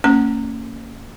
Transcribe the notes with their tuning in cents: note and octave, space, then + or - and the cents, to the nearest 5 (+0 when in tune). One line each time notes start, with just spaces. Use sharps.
A#3 -30 C#4 +0 A#5 -20